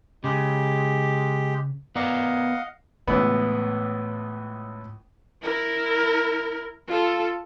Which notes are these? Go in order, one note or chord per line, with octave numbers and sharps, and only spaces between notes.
C#3 G#3 G4
B3 A#4 D5 D#5 F5 F#5
C#2 A2 E3 B3
E4 A#4
F4 A4